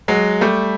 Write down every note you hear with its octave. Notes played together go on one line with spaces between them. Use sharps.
F#3 G#3
G3 A3